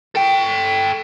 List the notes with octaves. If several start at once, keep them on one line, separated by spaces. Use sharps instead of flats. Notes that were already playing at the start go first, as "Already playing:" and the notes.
A4 G5